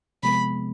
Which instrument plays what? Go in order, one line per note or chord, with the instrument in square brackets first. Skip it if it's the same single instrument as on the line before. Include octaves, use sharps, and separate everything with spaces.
[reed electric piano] C3 F3 G#3 B3 [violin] B5